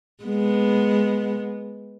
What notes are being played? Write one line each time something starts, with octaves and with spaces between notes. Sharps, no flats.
G#3 B3